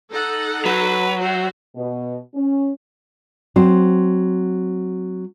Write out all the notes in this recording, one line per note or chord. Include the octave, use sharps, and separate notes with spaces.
D#4 A4 F#5
F#3 B4
F#4 C5 E5
B2
C#4
F#3 C4 C5